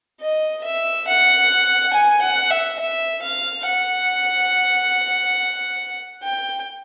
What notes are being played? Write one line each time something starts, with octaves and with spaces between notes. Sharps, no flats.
D#5
E5
F#5
G#5
F#5
E5
E5
F5
F#5
G5